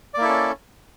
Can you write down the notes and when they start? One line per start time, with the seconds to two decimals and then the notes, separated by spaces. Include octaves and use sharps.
0.14 D5
0.18 A#3
0.21 E4
0.25 A4
0.28 C#4